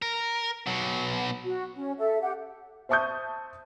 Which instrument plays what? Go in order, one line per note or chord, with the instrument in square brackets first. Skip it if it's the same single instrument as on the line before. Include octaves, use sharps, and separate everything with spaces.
[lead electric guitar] A#4
B2 F#3
[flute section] F#4
C#4
A4 E5
G4 F#5
[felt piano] C5 E5 A5 C#6 D#6 G6